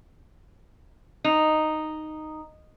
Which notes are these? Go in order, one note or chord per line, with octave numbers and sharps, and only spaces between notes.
D#4